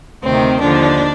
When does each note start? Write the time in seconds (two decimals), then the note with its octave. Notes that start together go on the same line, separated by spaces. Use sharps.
0.23 D2 C3 D#3 C4
0.61 D#2 D3 F3 D4